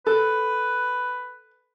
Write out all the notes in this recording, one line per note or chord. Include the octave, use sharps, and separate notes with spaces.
A4 B4